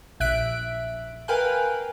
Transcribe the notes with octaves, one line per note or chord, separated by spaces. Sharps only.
A#1 E5 F#6 B6 D7
A#4 B4 F5 G5 G#5 F#6